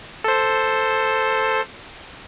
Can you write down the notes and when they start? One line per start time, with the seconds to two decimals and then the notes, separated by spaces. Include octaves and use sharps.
0.24 A4 C5